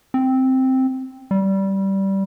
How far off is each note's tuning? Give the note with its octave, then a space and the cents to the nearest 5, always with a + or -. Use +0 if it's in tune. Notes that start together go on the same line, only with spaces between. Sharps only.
C4 +0
G3 -15